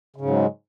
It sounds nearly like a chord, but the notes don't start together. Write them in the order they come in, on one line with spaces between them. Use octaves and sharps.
C#3 G#2 F#3 G#3